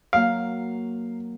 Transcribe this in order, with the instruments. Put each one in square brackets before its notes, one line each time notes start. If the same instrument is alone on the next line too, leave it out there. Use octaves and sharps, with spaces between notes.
[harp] F#3 A#3 [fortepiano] F5